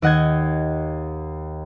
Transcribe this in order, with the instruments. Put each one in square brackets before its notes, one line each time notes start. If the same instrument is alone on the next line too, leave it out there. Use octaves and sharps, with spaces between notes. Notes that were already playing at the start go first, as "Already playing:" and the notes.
[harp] D#2 D#5 F#5 G6 G#6